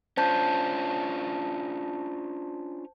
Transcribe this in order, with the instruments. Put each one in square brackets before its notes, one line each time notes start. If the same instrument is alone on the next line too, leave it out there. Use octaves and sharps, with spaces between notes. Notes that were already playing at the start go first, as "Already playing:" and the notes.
[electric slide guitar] C#4 D4 F4 [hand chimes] C5 A5 G6